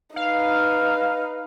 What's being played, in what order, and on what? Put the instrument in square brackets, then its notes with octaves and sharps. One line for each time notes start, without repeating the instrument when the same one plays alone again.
[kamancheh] D#4 B4 [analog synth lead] F5